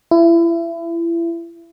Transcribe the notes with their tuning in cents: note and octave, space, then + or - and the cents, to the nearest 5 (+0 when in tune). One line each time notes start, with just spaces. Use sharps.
E4 +30